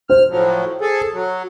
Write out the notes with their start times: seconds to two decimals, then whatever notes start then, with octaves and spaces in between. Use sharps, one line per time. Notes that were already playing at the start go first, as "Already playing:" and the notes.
0.10 C5 F6
0.30 A2 F3 F#3
0.81 G#4 A4
1.13 F#3